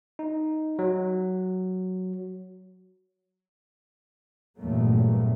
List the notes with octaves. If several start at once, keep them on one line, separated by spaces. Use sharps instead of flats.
D#4
F#3
E2 G2 A#2 F#3 A3 A#3